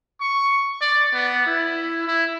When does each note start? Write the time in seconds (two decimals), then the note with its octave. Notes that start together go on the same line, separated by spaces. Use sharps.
0.21 C#6
0.81 D5
1.13 B3
1.47 E4
2.08 E4